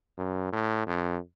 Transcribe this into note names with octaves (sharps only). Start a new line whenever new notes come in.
F#2
A2
F2